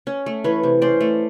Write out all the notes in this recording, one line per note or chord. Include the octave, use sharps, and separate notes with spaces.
C#4
A3
E3 B4 C#5
C3
C#4 C5 D5
A3